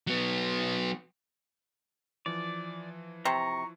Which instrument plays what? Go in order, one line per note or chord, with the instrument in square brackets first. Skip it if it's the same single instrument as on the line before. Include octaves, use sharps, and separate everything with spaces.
[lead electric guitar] F#3 B3
[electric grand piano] E3 F3 [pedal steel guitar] D5
[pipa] C3 [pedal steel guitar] A#5 [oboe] C#6